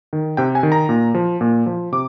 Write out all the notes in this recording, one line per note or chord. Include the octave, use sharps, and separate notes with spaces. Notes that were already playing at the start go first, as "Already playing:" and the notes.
D#3
C3 G5
G#5
D#3
A#5
A#2
F3
A#2
F3
C3 D6